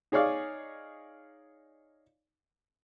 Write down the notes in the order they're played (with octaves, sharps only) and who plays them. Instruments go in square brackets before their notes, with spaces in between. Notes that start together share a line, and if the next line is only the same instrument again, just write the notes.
[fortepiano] D#4 G#4 C#5 D5 F5